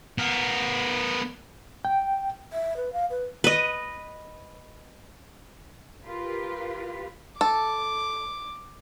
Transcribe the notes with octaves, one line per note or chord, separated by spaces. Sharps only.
B3 A#4
G5
E5
B4
F5
B4
B4 D#5
F4 G4 A#4 B4
A4 D6